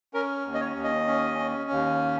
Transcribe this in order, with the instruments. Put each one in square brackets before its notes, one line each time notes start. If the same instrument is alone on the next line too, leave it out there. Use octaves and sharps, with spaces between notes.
[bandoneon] C#4 A#4
D#2
D#5
C#5
D#2
D#5
C#4
C#4
D#2